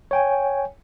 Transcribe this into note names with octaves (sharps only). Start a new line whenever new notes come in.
C#5 G5 G#5